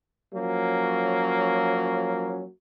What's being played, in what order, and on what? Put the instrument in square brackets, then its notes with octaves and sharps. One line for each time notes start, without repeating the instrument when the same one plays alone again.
[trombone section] F3 F#3 A#3 C#4